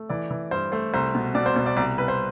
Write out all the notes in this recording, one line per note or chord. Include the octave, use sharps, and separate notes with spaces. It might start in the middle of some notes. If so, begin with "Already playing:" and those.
Already playing: A3
E3 D5
E3
G2 C5
A3 C5
C2 C5
B2
B2 D5
C5
B2 C5
D5
C2 D5
C2 B4
C5